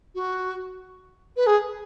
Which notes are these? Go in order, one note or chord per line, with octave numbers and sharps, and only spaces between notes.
F#4
B4
G#4